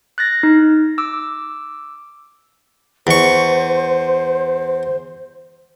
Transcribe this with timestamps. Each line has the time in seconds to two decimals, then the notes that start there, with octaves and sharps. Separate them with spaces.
0.18 F#6 A6 A#6
0.43 D#4
0.98 D6 E6
3.07 E2 C5 C#6